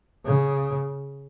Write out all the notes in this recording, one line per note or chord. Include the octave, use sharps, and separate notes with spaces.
C#3